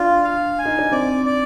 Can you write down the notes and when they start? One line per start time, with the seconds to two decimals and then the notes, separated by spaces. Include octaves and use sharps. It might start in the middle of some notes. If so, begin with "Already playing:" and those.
Already playing: D4 F4
0.24 F5
0.58 G#5
0.65 D#4
0.79 D4
0.92 C4 D5
1.26 D5